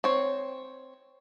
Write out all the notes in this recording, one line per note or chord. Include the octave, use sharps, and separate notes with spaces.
C4 C#5